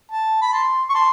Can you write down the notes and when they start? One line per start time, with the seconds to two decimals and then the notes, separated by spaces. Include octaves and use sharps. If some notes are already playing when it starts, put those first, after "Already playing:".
0.12 A5
0.42 B5
0.53 A5 C6
0.90 C#6
0.94 A5 C6